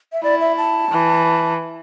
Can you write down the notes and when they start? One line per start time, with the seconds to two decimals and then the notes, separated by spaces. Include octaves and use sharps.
0.13 E5
0.23 E4 D5
0.41 E5
0.58 A5
0.91 E3